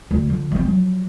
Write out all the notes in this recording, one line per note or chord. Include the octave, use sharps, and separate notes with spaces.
D2
D3 F3
E3 C4
F3 F#3